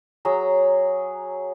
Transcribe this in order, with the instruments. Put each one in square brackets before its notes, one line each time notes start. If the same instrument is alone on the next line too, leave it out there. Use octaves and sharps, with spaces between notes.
[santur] F#3 G#4 A#5 E6